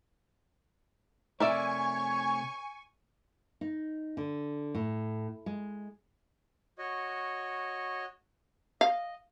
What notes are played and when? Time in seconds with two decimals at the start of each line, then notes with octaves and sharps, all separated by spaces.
1.40 C3 A3 A#4 C#5 D5 E5 G#5 C#6
3.61 D#4
4.17 D3
4.75 A2
5.46 G#3
6.78 F#4 C#5 D#5
8.81 D#5 F5